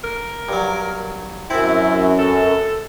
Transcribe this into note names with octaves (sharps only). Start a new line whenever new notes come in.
A#4
G2 F#3
F#2 C4 E4
A4